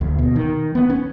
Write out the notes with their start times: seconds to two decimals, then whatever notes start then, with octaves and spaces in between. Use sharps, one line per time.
0.01 D2
0.18 B2
0.36 D#3
0.75 B3
0.90 C#4